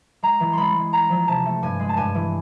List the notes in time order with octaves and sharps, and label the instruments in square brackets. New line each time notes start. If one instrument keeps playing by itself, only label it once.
[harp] G#3 A#5
E3
G#3 B5 C6
G#3
C#4 A#5
F3
C3 A5
A3
G2 G#5
G#3
A5
G2 G#5
E3